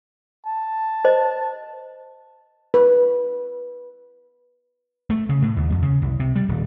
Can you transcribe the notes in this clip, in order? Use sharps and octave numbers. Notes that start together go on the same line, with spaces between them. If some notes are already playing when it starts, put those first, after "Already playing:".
A5
C5 D#5
B4
A3
C#3
A2
D#2
F2
C#3
C2
C3
G3
D#1